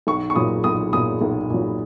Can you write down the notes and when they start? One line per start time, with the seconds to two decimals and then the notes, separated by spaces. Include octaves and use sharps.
0.07 B1 C#6
0.30 C#6
0.35 A#2 F#3 D#6
0.64 B1 D#6
0.93 A#2 F#3 D#6
1.21 B1
1.50 A#2 F#3